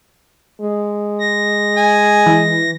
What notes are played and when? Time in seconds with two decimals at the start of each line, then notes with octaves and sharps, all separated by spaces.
0.61 G#3
1.20 A#6
1.77 G#5
2.26 E3